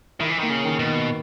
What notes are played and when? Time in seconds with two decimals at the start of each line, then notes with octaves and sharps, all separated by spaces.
0.20 D#3 E4
0.30 E3
0.39 D#3 A#3
0.50 C#3
0.65 D#3
0.79 B2
0.86 D#3